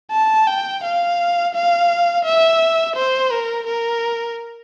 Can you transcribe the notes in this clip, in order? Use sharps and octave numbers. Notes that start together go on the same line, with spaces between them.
A5
G5
F5
F5
E5
C5
A#4
A#4